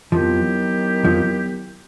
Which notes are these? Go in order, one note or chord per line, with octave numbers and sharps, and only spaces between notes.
F2 D#3 F3 F#3 B3 E4 G4
F2 F3